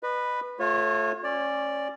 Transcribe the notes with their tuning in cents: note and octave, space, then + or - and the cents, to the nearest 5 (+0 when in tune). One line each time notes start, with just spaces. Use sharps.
B4 +0 D#5 -40
A3 +0 F4 +35 C#5 -25
C#4 -15 D5 +0